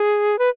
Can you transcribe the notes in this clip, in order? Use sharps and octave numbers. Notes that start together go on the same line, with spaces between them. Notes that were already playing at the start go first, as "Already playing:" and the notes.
Already playing: G#4
B4